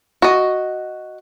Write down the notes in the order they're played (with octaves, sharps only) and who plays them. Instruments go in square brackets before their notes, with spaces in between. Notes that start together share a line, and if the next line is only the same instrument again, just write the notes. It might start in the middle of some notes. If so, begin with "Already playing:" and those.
[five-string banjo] F#4 D#5